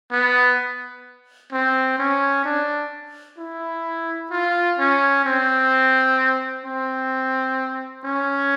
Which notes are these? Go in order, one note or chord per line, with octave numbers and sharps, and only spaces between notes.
B3
C4
C#4
D4
E4
F4
C#4
C4
C4
C#4